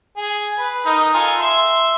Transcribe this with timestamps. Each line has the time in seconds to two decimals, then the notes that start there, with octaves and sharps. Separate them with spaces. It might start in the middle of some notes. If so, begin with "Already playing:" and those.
0.17 G#4
0.59 B4
0.86 D#4 A#4
1.14 F4 A4 G#5
1.40 E5 C6